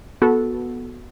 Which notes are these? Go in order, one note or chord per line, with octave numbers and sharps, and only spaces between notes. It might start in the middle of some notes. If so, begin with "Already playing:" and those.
B3 F#4 A4